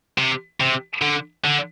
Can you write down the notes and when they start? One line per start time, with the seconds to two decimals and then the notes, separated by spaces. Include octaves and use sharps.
0.18 C3
0.60 C3
1.02 D3
1.45 D3